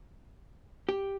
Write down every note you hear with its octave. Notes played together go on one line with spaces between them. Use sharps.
G4